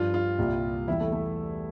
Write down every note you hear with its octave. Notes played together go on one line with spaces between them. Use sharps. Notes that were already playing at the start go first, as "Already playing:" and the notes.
Already playing: G2 F3 F4
F4
C2 A#2 G3
E2 E3 G3 E4
A3
A3